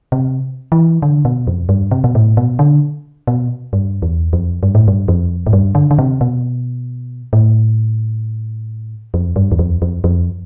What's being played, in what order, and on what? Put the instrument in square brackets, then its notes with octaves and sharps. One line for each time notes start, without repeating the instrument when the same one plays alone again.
[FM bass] C3
E3
D3
B2
F2
G2
C3
B2
A2
B2
D3
B2
G2
E2
F2
G2
A2
G2
F2
A2
G2
D3
D3
C3
B2
A2
F2
G2
E2
F2
F2
F2